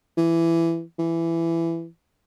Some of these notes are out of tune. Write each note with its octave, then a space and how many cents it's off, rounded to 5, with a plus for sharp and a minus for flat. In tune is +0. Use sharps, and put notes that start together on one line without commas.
E3 +15
E3 +15